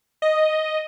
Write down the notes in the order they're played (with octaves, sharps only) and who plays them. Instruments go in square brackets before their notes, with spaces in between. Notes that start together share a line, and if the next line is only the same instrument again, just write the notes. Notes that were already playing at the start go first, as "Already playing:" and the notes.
[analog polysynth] D#5